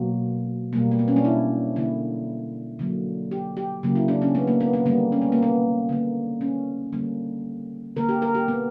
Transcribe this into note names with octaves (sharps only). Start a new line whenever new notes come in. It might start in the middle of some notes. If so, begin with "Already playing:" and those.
Already playing: B2 F#3 A#3
B2 G3 A#3
A#3
B3
C#4
D4
E4
D3 A#3 E4
D3 F#3 A#3
G4
G4
C#3 F#3 A#3
E4
D4
C#4
B3
A#3
B3
B3
D3 G3 A#3 B3
C#4
B3
A#3
B3
D3 A#3
C#4
D3 G3 A#3
D3 A#3 A#4
G4
A#4
G4
B3